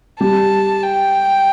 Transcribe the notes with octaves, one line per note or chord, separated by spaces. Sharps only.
G3 G4 A5
G5